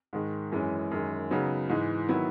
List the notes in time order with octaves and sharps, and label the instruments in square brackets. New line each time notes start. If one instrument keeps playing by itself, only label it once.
[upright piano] G#2 D#3 G#3
F#2 E3 G#3 C#4
F#2 D#3 G#3
C#3 F#3 B3 D#4
G#2 E3 G#3
D#3 F#3 B3 E4